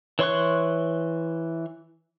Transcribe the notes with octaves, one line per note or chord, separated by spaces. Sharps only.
E3 C#5 C6 C#6 F#6